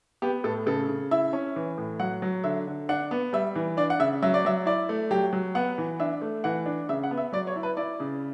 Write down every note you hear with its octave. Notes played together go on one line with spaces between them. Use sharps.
B3 G4
A2 A4
C#3 A4
C#3
E4 E5
C#4
E3
A2
F#3 F#5
F#3
D3 E5
D3
D4 F#5
B3
G3 E5
E3
D4 D5
F#5
C#3 E5
F#3 E5
D5
F#3 E5
E4 D5
A3
F#3 G4
F#3
B3 F#5
E3
D4 E5
A3
E3 F#5
D4
C#3 E5
F#5
B3
E5
F#3 D5
C#5
E4
B4
E4 D5
C#3